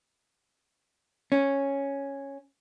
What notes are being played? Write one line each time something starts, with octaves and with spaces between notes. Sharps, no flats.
C#4